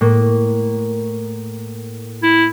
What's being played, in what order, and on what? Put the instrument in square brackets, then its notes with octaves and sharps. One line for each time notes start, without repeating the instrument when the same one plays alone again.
[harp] A2 A#3
[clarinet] E4